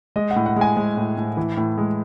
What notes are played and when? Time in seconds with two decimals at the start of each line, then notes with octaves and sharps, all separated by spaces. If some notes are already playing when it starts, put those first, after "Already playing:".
0.16 G#3 D#5
0.31 F#5
0.36 A2
0.46 F#5
0.56 G#3 G#5
0.77 G#3
0.97 A2
1.17 A2
1.37 E3
1.57 A2
1.78 G#3